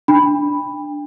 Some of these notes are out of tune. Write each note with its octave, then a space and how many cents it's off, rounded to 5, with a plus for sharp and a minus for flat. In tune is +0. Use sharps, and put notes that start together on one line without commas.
D4 +0 G5 +35 B5 +0